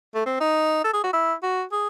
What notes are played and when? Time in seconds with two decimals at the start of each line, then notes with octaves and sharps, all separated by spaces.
0.15 A3
0.26 C4
0.40 D#4
0.84 A4
0.93 G#4
1.03 F#4
1.13 E4
1.43 F#4
1.72 G#4